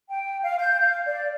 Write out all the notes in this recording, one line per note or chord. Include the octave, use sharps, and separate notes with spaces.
G5
F5
G6
F5
D5